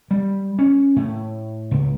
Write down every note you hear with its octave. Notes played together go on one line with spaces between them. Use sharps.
G3
C#4
A2
C#2